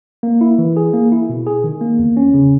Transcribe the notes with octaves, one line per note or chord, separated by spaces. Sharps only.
A#3
E4
E3
G#4
A#3
E4
B2
G#4
D#3
A#3
E2
C#4
C#3